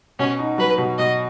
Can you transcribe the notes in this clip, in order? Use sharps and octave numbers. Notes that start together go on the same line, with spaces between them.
B2 C#4
D#4
F#3 B4
B2
B2 D#5